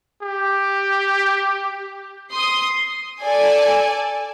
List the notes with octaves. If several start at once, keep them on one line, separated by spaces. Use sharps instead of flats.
G4
C6 D#6
A4 D5 G#5